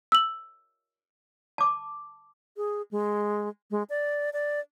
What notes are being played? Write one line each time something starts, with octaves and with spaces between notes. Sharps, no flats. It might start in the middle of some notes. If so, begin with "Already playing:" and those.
E6 F#7
A5 D6
G#4
G#3
G#3
D5
D5